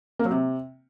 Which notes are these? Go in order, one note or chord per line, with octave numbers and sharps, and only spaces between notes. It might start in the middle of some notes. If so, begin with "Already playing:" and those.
A#3
F#3
C3